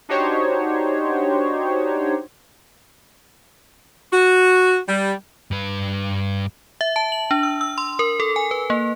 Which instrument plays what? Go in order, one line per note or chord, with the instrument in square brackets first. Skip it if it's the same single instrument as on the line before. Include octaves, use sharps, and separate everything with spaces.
[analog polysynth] D4 D#4 F#4 G4 C5 C#5
[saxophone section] F#4
G3
[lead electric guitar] G2 B4
[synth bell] E5
A5
F#7
D4
E6
E6
C6
A#4
A4
G#5
B4
A#3